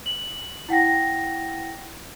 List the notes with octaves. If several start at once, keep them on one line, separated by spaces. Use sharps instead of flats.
F#7
E4 F#5 G5 A#6